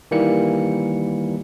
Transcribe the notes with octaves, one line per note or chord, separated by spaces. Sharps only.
D#3 E3 G3 A#3 C#7